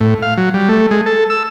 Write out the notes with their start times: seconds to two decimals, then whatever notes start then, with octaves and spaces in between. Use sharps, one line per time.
0.01 A2
0.22 F5
0.38 F#3
0.54 G3
0.69 A3
0.91 G#3
1.06 A4
1.30 E6